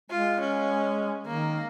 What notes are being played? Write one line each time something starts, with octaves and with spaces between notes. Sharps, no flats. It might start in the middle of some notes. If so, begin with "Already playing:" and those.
G#3 F4
C#4
D#3 A#3